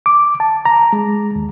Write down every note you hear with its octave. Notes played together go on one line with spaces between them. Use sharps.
D6
A5
A#5
G#3
D#2